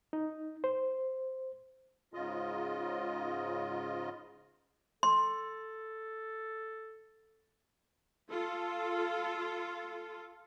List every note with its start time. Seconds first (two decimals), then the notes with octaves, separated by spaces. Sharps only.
0.13 D#4
0.64 C5
2.14 G#2 C#3 F4 D#5
5.03 A4 C6
8.30 F4 A4